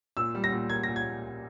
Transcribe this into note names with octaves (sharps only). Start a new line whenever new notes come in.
A#2 E6
G3
A#6
A#2
A#3 G#6
A#6
A#2
G#6